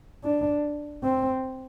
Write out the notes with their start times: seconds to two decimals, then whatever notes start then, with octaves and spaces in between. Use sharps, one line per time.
0.24 D4
1.04 C4